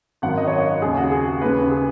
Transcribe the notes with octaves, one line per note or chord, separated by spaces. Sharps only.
G#1 F#2 D#3 F#5
D#5
C#5
D#5
D#2 C#3 G#4
F#4
G#4
D#2 C#3 B4
G#4